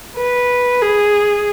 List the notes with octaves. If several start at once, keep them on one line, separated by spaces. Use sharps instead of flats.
B4
G#4